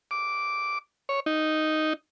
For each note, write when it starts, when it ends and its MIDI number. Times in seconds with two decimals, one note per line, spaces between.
0.11 0.78 86
1.09 1.20 73
1.26 1.93 63